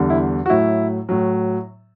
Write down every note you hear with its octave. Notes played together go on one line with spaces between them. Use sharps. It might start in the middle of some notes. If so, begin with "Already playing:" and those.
Already playing: E2 D3 G3
E4
F#4
A2 F#3 E4
A2 F#3